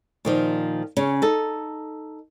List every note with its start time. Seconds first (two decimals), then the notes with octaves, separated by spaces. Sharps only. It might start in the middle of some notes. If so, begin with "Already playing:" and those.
0.25 A#2 D#3 F3
0.97 C#3 C#4
1.22 D#4 A4